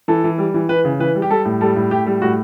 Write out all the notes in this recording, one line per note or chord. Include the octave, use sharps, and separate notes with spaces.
E3 A4
E3
G3
E3
E3 B4
C#3
E3 B4
G3
G4
G3 A4
A2
G3 A4
A2
A2 G4
G3
A2 F#4